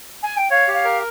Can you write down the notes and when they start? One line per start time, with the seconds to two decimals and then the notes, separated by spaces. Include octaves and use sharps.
0.22 G#5
0.36 G5
0.50 C#5 F5
0.68 G4
0.73 F5
0.84 A#4